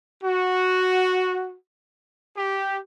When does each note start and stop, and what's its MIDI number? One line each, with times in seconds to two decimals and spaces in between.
0.23 1.55 66
2.36 2.77 67